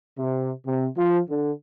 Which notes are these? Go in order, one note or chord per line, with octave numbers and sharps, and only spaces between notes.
C3
C3
F3
D3